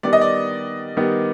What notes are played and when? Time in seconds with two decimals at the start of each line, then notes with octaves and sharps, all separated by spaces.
0.03 D#3 G3 B3 D5
0.13 D#5
0.21 D5
0.97 D#3 G3 B3